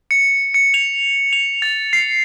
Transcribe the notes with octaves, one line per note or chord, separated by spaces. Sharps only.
C#7
C#7
F7
F7
A6
C7